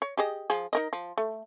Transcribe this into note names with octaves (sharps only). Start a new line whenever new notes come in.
C#5
G4 G#4 D#5
F3 G#4
D#4 A#4 D#5
F3
A3